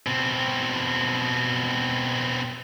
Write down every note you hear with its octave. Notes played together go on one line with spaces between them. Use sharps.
B2 C4